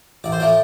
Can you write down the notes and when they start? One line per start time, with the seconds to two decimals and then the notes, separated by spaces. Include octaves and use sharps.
0.24 A1 D5
0.32 C5
0.40 A2 F3 A3 D5